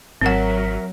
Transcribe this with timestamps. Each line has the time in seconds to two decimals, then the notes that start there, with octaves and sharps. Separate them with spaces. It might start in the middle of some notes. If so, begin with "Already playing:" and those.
0.21 G#1 F#3 C4 A#4 E5 F#5